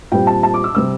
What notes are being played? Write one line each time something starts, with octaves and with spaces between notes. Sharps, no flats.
A#2 G3 C4 G5
A5
A5
D6
E6
C3 G3 C4 E6